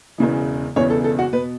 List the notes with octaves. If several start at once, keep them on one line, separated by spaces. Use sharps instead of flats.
E1 E2 C#3 E3
E1 E2 C#3 E3 C#5
A4
A4
F#4
B2 B4